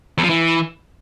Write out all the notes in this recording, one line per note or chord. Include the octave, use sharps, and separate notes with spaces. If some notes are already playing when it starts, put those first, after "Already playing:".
E2
F3
E3